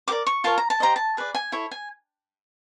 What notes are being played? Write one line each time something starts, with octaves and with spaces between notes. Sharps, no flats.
G4 A#4 D5 D6
C#6
F4 A#4 C#5 A5
A#5
A5
G4 C5 D#5 A#5
A5
G#4 B4 D5
G#5
E4 A4 C#5
G#5